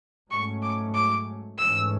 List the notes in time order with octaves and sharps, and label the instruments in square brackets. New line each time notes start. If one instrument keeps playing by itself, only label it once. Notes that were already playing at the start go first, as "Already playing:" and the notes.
[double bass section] G#2 F#3 A3 C#4 [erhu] C#6
[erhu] D6
D6
[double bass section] G#2 E3 A3 C#4 [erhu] E6